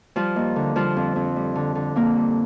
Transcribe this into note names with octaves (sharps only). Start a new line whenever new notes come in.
F3 G3 F4
D#2
D3
F3 G3 F4
F2
F2
G3
D3
D3
F2 A#3
G3